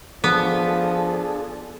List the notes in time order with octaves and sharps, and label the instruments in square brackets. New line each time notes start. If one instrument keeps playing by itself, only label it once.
[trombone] F3 [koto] B3 [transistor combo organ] D4 G#4 A4